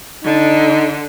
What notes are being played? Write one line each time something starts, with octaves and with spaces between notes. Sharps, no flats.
D3 D#4